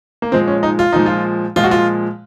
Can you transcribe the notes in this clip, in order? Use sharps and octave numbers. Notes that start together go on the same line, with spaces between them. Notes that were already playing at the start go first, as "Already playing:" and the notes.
A#3
A#2 F3 G#3 C4
C#4
D#4
F4
A#2 F3 G#3 D#4
F4
A#2 F3 G#3 F4
F#4
F4